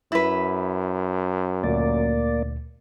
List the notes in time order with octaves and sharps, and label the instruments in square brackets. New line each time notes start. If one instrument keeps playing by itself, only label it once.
[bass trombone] F#2 [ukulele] E4 B4
[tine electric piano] D2 A#2 [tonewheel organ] A#3 D5